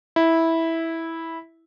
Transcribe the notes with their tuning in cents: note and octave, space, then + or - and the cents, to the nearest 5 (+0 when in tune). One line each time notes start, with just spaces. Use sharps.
E4 -10